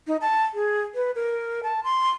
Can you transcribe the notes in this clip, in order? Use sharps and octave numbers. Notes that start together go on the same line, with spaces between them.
D#4
A5
G#4
B4
A#4
A5
C6